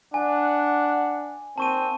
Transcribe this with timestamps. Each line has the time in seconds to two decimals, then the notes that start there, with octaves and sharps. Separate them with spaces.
0.14 D4 F#5 G#5
1.58 D#2 A#2 C4 A5 C#6 D#7